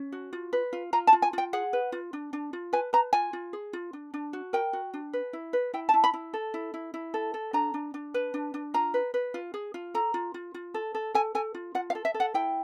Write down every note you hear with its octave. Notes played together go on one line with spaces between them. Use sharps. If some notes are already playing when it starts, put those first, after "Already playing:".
Already playing: C#4
F#4
F4
B4
F4
F4 A#5
A5
F4
G#5
F4 G5
G#4 F#5
B4
F4
D4
D4
F4
B4 G#5
B4 A#5
F4 G#5
F4
G#4
F4
D4
D4
F#4
A#4 G5
F#4
D4
B4
E4
B4
E4 G5
A5
E4
B5
E4
A4
E4
E4
E4
A4
A4
D4 A#5
D4
D4
B4
D4
D4
F4 A#5
B4
B4
F4
G#4
F4
A4 A#5
F4
F4
F4
A4
A4
A4 G#5
A4 G#5
F4
F4 F#5
F5
A4
E5
A4
F#5
E4 G5